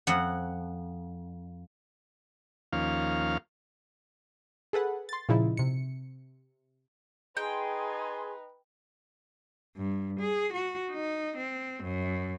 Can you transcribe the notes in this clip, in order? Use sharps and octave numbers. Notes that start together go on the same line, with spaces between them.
F2 F#5
D#2 F3 A#3 C#4 F5
G#4 A4 B4 F#5
C6 A6
A#2 C#3 F3 D#4 E4
C3 C#7
D#4 G#4 B4 G5 C6
G2
G#4
F#4
D#4
C4
F#2